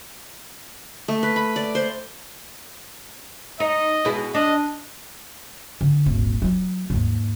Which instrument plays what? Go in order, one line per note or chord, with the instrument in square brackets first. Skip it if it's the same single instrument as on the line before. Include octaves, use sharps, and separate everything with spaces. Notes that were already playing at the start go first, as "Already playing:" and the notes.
[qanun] A3
B4
B5
D5
C5
[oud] D#4 [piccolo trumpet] D#5
[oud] B2 G#3 E4
[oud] D4 [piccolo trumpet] D#5
[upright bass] D3
D#1 G#1
F#3 F4
D#2 G#2